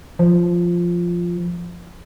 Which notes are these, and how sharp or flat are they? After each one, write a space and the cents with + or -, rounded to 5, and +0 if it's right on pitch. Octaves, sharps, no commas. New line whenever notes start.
F3 -5